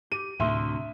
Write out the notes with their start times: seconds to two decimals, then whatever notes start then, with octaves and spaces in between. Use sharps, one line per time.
0.12 G4 D#7
0.40 D2 A2 C3 E5 C6